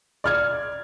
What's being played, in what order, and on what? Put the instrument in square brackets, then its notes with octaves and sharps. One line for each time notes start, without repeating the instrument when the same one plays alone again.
[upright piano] D5 F6 G#6